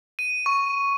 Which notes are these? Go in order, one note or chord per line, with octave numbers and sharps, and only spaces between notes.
D#7
C#6